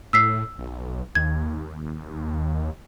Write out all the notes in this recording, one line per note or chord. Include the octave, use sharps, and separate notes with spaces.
A2 E6 B6 C7
B1
D#2 G#6